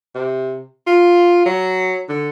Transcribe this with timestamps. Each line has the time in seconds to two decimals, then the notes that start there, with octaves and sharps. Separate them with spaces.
0.15 C3
0.87 F4
1.45 F#3
2.09 D3